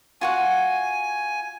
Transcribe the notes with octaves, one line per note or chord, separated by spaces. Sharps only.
F4 F#4 F#5 G#5